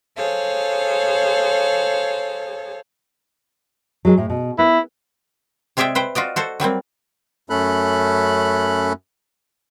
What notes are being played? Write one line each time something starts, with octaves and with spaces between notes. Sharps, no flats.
G#4 A4 C5 C#5 F5
F#3 G#3 G#4
A2
B2
B3 E4
C3 G#3 G#4 D5 E5 G5
B4 C5 G5
F4 F#4 D5 D#5
F#4 A4 C5
F#3 G3 A#3 C4
F#2 A3 C#4 A4 B5 F#6